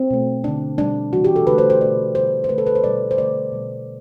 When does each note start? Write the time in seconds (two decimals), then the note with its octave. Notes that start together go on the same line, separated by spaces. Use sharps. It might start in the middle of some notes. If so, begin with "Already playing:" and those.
Already playing: C4
0.11 B2 A3
0.44 D3 A3 D4
0.78 B2 G3 D4
1.12 C3 E3 G3 F#4
1.24 G4
1.36 A4
1.47 D3 A3 B4
1.58 C5
1.70 C5
1.81 B2 A3 D5
2.15 D3 G3 C5
2.44 C5
2.49 D3 A3 B4
2.58 A4
2.66 B4
2.75 C5
2.84 B2 G3 D5
3.11 C5
3.18 D3 A3 D5
3.52 B2 G3